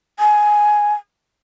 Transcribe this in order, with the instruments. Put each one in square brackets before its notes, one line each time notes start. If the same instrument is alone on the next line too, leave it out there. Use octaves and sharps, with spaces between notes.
[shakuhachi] G#5